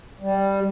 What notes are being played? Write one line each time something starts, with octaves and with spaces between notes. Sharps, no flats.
G3